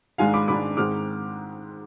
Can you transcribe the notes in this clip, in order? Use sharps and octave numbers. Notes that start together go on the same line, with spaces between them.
G#2 D#3 G#3 D4 F5 G#5
B5 D6
G#2 D#3 G#3 D4 B5 D6
G#2 D#3 G#3 C4 D6 F6